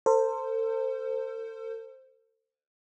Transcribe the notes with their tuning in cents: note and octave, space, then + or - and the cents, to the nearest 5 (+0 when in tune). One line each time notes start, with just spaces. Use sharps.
A4 +40 C5 +0